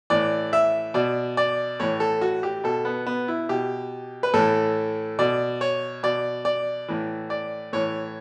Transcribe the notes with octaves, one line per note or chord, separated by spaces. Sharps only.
A2 E3 D5
E5
B2 D5
D5
A2 E3 C#5
A4
F#4
G4
B2 A4
B3
B3
E4
B2 G4
B4
A2 E3 A4
B2 D5
C#5
B2 D5
D5
A2 E3
D5
A2 E3 C#5